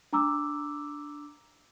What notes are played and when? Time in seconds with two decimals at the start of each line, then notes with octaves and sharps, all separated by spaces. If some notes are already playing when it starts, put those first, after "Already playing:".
0.13 D4 A#5 D6 E6